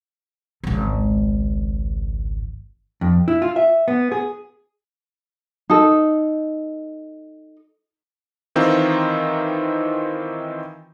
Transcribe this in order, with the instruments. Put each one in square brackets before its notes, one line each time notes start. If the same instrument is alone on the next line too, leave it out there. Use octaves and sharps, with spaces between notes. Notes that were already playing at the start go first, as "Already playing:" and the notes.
[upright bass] G#1 C#2
[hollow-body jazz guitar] F2
E4
F4
E5
B3
G#4
[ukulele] D#4 A4
[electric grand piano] D#3 E3 C4 D#4 F4